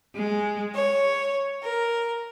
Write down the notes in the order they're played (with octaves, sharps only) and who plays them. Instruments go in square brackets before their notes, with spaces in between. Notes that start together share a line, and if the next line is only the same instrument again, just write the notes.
[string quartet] G#3
C#5
A#4